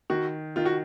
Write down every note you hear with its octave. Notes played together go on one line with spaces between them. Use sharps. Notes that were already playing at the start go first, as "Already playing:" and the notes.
D#3 F#4
D#3 F4
F#4